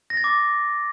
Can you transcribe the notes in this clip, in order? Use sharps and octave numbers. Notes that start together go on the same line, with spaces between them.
A#6
A6
D6